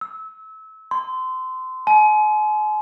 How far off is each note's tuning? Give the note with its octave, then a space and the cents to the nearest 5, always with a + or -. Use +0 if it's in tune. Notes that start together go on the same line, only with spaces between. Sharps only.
E6 -25
C6 -25
G#5 +40